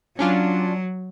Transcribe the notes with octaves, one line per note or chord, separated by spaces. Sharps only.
F#3 C#4 D4 F4